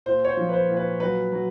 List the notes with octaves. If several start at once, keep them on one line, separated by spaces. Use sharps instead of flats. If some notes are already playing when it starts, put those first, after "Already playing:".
A#2 C5
C#5
C5
F3
B4
C5
A#2
B4
F#3 B4
F#3